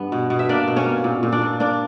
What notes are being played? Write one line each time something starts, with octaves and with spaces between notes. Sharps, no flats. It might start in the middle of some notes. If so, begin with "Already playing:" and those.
Already playing: G2 B3
B2
B2
E5
A#3 D4 D5
B2
C#4 C#5
A#3
A#2
A#2
D4 D5
A#2
A#3 D4 D5